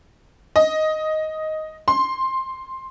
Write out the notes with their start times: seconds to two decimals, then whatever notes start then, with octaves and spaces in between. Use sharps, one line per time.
0.56 D#5
1.88 C6